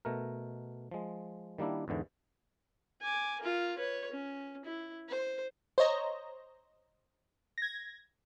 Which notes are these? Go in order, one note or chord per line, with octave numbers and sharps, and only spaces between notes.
B2 A3 A#4
F3 G#3
D#3 G3 A#3 D4 E4
E2 G#2 D3 E3
G#5 D6
F4 A#4
B4 C#5
C#4
E4
C5
C5 C#5 D#5 A#5
G#6 A#6